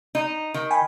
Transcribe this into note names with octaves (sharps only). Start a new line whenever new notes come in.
D#4
D#3
G5 G#5 B5